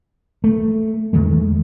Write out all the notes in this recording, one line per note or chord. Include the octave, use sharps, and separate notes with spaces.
A3
E2 D#3 G#3 A3